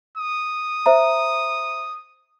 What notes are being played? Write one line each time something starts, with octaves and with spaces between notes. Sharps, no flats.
D#6
C5 E5 A#5